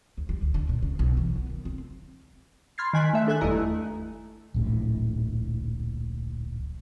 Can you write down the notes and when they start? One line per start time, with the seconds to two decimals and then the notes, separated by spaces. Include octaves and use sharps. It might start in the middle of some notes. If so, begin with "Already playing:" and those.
0.17 D#2
0.29 G3
0.42 D2
0.54 D3
0.69 A#2
0.82 C#3
0.99 B1
1.17 E3
1.35 B3
1.49 D#3
1.65 C4
2.78 B5 C6 F6 G#6 A6 C7
2.93 D#3 G#5 F#6 B6
3.13 A3 E5
3.27 D4 A4 G#5 F#6
3.41 G1 E2 G2 E4 D#5 A#5
3.55 A3
4.54 D1 A#1 A2